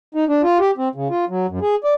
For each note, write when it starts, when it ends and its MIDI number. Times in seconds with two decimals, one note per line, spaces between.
0.14 0.25 63
0.28 0.42 62
0.43 0.58 65
0.59 0.71 67
0.77 0.89 60
0.95 1.08 49
1.10 1.25 65
1.29 1.46 54
1.49 1.59 42
1.62 1.75 68
1.84 1.94 74